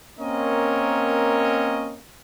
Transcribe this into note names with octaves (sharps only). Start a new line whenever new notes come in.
A#3 C4 C#4 A#4 C#5 D#5